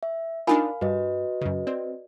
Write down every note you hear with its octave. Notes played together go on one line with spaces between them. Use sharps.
E5
D4 D#4 F4 A#4 F5 G#5 B5
G2 F#4 B4 D#5
F#2 C#3
C4 D5